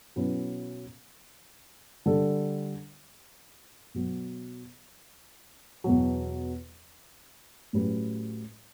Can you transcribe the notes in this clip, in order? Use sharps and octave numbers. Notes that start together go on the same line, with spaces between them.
B2 F#3 C#4 E4 B4
D3 G3 D4 A4
B2 F#3 B3
E2 B2 F#3
A2 F#3 C#4 G4 B4